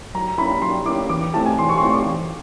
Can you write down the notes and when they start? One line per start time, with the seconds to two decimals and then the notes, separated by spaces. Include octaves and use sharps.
0.15 F#3 A#5
0.38 A#3 C#4 E4 B5
0.62 F#3 C6
0.86 A#3 C#4 E4 D6
1.09 E3 D6
1.33 A3 C4 E4 G4 A5
1.46 G#5
1.57 E3 C6
1.69 C#6
1.78 C6
1.82 A3 C4 E4 G4 C#6
1.94 D6
2.05 E3